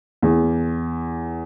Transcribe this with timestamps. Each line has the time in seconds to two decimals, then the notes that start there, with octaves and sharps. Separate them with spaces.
0.22 E2